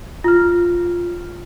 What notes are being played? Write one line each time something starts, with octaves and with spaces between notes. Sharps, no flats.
F4 F6